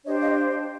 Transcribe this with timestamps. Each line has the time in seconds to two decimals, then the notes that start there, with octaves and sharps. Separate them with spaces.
0.05 D4 G4 C5 C#5 D#5
0.20 D#5 F5